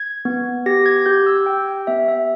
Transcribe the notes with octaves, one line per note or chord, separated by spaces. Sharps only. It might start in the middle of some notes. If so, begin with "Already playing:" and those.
Already playing: G#6
B3
G4 A#6
G#6
G4 G6
E6
G4 G5
G5
B3 E5
E5